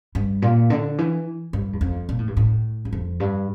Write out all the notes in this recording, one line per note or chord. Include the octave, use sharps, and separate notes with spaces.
G2
A#2
D3
E3
G2
E2
F2
A#2
A2
G2
A2
E2
F2
G2